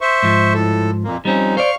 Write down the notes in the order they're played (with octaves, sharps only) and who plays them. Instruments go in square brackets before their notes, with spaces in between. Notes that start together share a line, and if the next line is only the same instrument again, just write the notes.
[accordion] C5 E5 C#6
[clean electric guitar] G#2 F3
[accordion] A2 A4
F2 A#2 A#3
[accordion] F3 D#4 [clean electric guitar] G3 C4 C#4
[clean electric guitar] C5 D5 [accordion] F5 C#6 F6